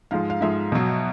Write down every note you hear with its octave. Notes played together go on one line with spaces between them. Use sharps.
G#2 F3 G#3 F5
F5
G#2 F3 G#3 E5
B2 F#3